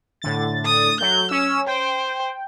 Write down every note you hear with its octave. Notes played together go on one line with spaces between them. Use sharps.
A2 D3 A6
D#6
F#3 A3 G6
C#4 E6
C5 G5